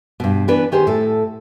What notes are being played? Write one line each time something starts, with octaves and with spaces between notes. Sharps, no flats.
G2 B2
E3 B3 D4 B4
D#3 G4 G#4 C5
A2 A4